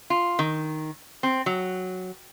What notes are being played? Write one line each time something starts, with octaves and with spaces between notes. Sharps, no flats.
F4
D#3
C4
F#3